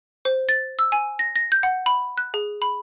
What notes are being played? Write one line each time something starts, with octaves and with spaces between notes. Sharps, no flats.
C5
A6
E6
G#5
A#6
A#6
G6
F#5
B5
F#6
G#4
B5